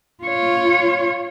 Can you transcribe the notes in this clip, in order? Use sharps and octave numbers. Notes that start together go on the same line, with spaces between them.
F4 C#5